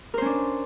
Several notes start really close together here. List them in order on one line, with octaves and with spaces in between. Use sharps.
A#4 C5 C#4 D4